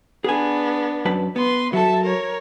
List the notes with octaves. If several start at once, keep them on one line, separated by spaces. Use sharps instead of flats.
B3 D4 G#4 G#5
F#2 B4 A5
B3 B4 C6
F#3 A4 E5 A5
A#4 C#5